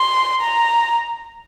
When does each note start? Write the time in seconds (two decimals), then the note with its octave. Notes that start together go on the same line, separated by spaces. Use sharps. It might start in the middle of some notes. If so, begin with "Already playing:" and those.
Already playing: C6
0.41 A#5